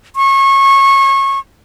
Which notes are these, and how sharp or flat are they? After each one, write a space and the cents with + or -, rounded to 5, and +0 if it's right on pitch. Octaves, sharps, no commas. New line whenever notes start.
C#6 -25